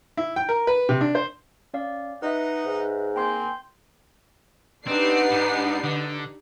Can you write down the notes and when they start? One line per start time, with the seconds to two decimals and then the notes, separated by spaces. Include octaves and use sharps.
0.17 E4
0.36 G5
0.49 A#4
0.67 B4
0.89 C3
1.01 D4
1.15 C5
1.74 C#4 D5 F5
2.22 D#4 B4 D#5 E5 F#5
2.66 G#2
3.16 A#3 C4 G5 G#5 C6 G6
4.87 C4 D4 D#4 G4 B4 F#5 C7
5.31 G#2
5.84 D3